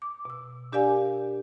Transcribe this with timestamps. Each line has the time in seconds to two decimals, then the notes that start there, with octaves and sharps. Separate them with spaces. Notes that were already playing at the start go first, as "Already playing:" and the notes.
0.02 D6
0.25 B2 E6
0.72 D4 G4 A#4 D5 F5 G#5